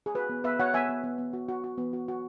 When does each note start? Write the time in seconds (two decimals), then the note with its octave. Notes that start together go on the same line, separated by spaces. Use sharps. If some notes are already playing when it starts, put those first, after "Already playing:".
0.06 G#4
0.15 F#4 B4
0.29 B3
0.44 B3 B4 E5
0.59 F#4 C#5 F#5
0.74 B3 E5 G#5
0.89 B3
1.04 B3
1.18 B3
1.33 F#4
1.49 F#4
1.64 F#4
1.78 B3
1.93 F#4
2.08 F#4